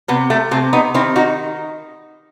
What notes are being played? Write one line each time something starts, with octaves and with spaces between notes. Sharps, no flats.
C3 B3
A3
C3 A3 C4
B3 D#4
D#3 C4 E4
D#4 F#4